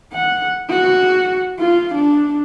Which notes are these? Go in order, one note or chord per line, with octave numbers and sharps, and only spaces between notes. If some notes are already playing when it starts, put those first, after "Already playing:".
F#5
F#4
F4
D4